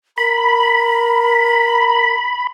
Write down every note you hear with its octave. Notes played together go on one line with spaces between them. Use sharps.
A#4 A#5 B5